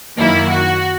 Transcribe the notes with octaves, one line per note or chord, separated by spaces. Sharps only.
F#2 D#3 F#3 A#3 E4
F#4